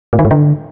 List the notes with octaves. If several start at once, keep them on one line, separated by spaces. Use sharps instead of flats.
A2
D#3
G#2
D3